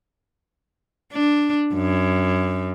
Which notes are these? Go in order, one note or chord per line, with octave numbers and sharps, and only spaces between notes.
D4
F#2